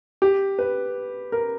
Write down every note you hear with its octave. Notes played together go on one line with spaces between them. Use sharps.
G4
B4
A#4